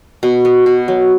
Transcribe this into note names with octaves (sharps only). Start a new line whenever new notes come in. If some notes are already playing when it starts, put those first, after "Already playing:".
B2
B3
B2
F#3